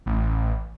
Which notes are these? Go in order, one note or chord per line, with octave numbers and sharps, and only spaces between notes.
A1